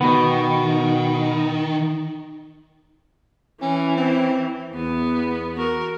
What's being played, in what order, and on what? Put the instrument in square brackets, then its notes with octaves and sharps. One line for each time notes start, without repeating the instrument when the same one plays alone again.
[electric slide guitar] B2 B3 [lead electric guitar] D#3
[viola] E3 [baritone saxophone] C#4
[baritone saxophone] C4
[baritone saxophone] E2 [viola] B3
[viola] F#4 A#4